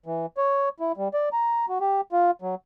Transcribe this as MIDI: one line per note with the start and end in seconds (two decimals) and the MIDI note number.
0.06 0.26 52
0.37 0.69 73
0.80 0.92 64
0.97 1.08 55
1.14 1.29 74
1.33 1.66 82
1.69 1.78 66
1.80 2.01 67
2.12 2.31 65
2.42 2.55 54